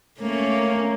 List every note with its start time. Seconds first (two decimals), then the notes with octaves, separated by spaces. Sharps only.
0.20 A3 A#3 C#4